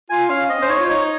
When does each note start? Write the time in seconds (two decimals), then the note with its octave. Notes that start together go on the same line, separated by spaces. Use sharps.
0.10 F4 G#5
0.29 C#4 F5
0.49 C4 D#5
0.60 C#4 C5
0.69 D#4 C#5
0.79 F4
0.89 D#4 C#5